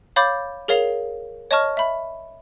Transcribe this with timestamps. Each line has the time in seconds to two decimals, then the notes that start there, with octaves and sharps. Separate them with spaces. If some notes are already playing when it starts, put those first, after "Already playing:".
0.16 C#5 F5 B5 D6 G6 A6
0.68 G#4 A#4 C#5 F5 C7 F7
1.51 C#5 D#5 A5 C#6 F6
1.77 E5 B5